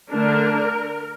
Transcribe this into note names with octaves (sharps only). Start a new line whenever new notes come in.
D3 A3 D4 A#4